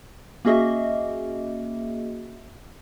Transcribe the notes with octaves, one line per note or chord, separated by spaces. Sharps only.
A#3 C#4 F#4 G#4 D#5 E5